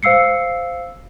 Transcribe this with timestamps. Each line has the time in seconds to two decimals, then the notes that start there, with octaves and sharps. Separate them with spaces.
0.03 C5 F5 E6 C7 C#7